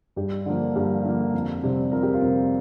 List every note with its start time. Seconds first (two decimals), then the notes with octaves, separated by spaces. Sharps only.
0.16 G2 G4
0.46 D3 F3 A#3
0.76 G2 G4
1.04 D3 F3 A#3
1.34 F2
1.63 C3 G3 C4
1.92 F2 A#4
2.03 G4
2.14 F4 A#4
2.21 C3 G3 C4